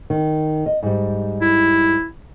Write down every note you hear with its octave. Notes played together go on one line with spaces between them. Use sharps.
D#3
D#5
G#2 G3
E4